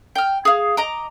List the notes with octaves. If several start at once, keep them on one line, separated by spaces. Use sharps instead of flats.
G5 F6
G#4 F5
D#5 A#5 D6